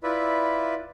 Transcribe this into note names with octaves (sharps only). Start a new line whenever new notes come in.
E4 F4 B4 D5 E5